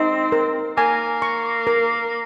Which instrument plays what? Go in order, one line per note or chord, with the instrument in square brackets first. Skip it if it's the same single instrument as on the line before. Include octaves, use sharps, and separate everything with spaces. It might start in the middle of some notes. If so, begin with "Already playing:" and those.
Already playing: [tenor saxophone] C4 [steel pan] D#4
[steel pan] A#4
[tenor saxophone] A#3 [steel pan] G#5
[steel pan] C#6
A#4